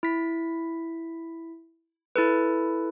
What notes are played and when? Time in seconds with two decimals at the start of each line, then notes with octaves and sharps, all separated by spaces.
0.03 E4 B6
2.16 E4 A4 B4